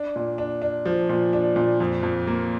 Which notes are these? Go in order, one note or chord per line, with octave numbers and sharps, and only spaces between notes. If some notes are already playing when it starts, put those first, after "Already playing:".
Already playing: D4
A#2
D4
D4
F3
A#2
D4
A#2
F2
F2
A#3